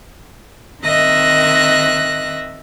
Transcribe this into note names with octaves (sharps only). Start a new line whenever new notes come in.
D#3 C4 D#5 E5 F#6 A#6